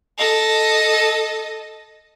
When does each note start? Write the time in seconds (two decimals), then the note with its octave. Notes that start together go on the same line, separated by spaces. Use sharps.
0.18 A4 D#5